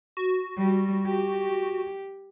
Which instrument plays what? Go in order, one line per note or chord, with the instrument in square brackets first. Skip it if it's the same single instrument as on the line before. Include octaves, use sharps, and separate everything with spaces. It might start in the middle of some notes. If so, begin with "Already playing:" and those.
[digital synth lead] F#4
[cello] G3
G4